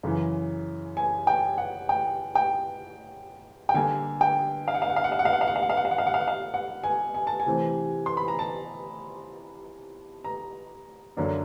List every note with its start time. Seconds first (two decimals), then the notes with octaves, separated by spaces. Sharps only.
0.03 F#2 C#3 E3
0.97 G#5
1.27 G5
1.58 F#5
1.89 G5
2.35 G5
3.69 G5
3.74 D3 G3 A#3 G#5
4.21 G5
4.68 F5
4.75 F#5
4.82 F5
4.89 F#5
4.96 F5
5.04 F#5
5.12 F5
5.19 F#5
5.25 F5
5.33 F#5
5.41 F5
5.48 F#5
5.56 F5
5.62 F#5
5.70 F5
5.77 F#5
5.85 F5
5.91 F#5
5.98 F5
6.07 F#5
6.14 F5
6.21 F#5
6.28 F5
6.54 F#5
6.84 G#5
7.15 G#5
7.27 A5
7.40 G#5
7.46 C3 E3 A3 C4
8.06 C6
8.17 B5
8.28 A#5
8.39 A5
10.25 A#5
11.17 F#2 D3 F#3 A#3 D4